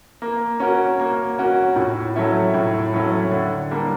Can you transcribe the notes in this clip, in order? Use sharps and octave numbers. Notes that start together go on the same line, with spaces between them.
A#3
C#4 F#4 A#4
A#3
C#4 F#4 A#4
A2
F#3 A3 C#4 E4
A2
F#3 A3 C#4 E4
D3
G3 A#3 D4